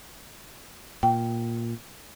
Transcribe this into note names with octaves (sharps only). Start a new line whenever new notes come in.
A#2 G5